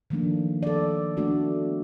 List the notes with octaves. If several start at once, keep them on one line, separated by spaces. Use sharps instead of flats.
D#3 F3 A3 A#3 D4
A4 D5
A3 B3 D4 F#4